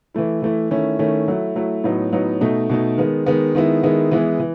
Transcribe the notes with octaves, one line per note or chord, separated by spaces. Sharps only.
E3 A3 E4
E3 A3 E4
D#3 A3 C#4 E4
D#3 A3 C#4 E4
F#3 A3 E4
F#3 A3 E4
A2 F#3 B3 D#4
A2 F#3 B3 D#4
B2 A3 D#4
B2 A3 D#4
D#3 G#3 B3
D#3 G#3 B3
D#3 G#3 B3 E4
D#3 G#3 B3 E4
E3 G#3 B3 E4
E3